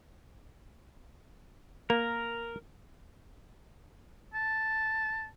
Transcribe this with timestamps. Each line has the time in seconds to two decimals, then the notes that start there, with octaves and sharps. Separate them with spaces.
1.90 A#3 A#4
4.34 A5